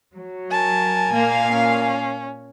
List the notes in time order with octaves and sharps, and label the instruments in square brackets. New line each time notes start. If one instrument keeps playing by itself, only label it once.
[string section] F#3
[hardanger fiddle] A#4 G#5 [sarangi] A5
[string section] A#2 F5 [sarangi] A#3
[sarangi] C#4